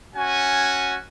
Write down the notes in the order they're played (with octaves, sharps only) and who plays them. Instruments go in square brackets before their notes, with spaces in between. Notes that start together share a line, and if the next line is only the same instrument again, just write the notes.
[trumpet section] C#4 F#4 G#5